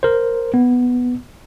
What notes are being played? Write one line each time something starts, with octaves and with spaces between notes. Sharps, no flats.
A#4 C5
B3